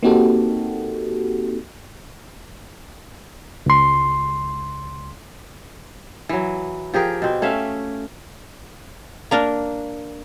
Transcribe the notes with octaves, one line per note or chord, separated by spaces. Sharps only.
A#3 C4 D#4 F#4 G4 A4
C#2 C6
E3 F#3
F3 G4 G#4 A#4
B2 C4
A3 C#4 E5 F5
A#3 D4 A#4